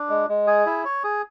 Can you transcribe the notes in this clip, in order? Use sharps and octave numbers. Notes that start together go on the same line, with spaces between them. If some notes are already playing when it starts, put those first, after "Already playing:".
Already playing: D4
G#3
G#3
G#4
E4
C#5
G#4